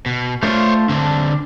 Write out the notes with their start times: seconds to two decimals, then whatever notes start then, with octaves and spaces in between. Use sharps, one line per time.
0.06 B2
0.43 A3 D4 F4 C5 C#5
0.89 D3 C4 D4